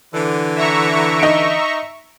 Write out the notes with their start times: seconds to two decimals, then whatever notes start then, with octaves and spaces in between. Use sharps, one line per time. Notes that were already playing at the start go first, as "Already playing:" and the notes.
0.14 D3 E3
0.56 E5 A#5 C#6
1.19 D#4 D7